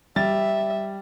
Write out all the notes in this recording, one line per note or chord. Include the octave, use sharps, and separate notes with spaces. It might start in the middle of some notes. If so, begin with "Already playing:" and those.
G3 E5 A6